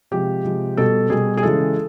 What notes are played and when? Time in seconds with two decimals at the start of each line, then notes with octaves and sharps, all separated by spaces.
0.11 C3 F3 G#3 G4
0.44 C3 F3 G#3
0.77 B2 G3 A4
1.10 B2 G3 G#4
1.37 G#4
1.43 C#3 E3 G#3 A4